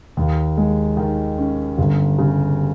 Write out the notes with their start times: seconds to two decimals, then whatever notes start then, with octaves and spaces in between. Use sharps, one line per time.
0.17 D#2
0.57 G#3
0.97 D#3
1.38 C#4
1.78 G1
2.18 C#3